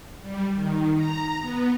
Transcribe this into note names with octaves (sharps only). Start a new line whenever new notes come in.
G3
D#3
A#5
B3